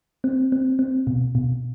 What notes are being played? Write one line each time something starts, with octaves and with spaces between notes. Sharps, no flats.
C4
C4
C4
B2
B2